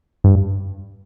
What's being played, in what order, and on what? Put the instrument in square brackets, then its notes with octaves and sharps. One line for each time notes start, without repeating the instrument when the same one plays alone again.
[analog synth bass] G2